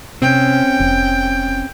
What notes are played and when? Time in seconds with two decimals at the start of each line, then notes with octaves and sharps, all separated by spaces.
0.22 C3 C4 C#4 G5
0.80 F1